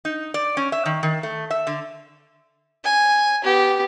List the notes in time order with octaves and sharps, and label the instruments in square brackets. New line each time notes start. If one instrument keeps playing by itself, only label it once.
[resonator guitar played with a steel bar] D#4
D5
C#4
E5
D#3
D#3
A3
E5
D3
[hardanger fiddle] G#5
B3 G4